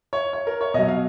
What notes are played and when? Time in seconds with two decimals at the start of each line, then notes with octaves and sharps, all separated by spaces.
0.13 C#5
0.33 C#5
0.47 A#4
0.61 C#5
0.74 B2 F#3 D#5
0.88 F5